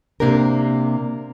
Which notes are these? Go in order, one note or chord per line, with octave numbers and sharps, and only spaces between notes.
C3 A#3 D4 G4 A#4